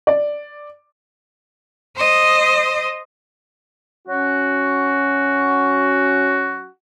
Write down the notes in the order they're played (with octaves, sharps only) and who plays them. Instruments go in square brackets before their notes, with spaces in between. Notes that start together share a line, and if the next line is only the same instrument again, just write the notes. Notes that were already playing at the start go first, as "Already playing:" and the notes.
[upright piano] D5
[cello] C5 D#5
[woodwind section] F#3 C#4 F#4